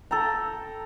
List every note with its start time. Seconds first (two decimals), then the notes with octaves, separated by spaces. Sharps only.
0.11 A4 G5 A#5